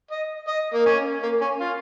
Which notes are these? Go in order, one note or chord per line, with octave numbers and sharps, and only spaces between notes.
D#5
D#5
A#3
C#4
A#3
C#4
F4